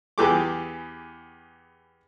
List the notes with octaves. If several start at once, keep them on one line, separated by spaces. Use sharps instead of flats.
E2 E3 G4 G#4 D6